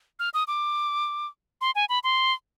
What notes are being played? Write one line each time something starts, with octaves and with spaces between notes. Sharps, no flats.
F6
D#6
D6
C6
G#5
B5
C6